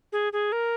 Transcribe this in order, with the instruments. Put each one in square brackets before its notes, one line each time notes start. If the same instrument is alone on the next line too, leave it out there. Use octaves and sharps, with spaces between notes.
[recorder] G#4
G#4
A#4